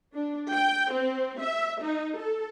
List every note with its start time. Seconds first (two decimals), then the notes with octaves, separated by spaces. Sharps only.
0.15 D4
0.51 G5
0.92 C4
1.42 E5
1.81 D#4
2.18 A4